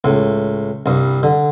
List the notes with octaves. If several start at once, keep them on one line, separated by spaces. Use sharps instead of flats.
C#2 A2
C2 G2
D3